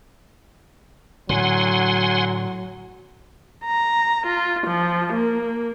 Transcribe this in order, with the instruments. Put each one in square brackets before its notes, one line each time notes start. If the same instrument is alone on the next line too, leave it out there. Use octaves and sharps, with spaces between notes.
[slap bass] A2 D3 [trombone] F#3 [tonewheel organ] F#5 G#5 C6
[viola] A#5
F4
F3
A#3